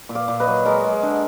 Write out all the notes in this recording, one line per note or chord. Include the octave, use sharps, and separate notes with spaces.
A#2
D5 F5
A#2
B4 D#5
F#3
G#3 A#4 D5
G#3
D3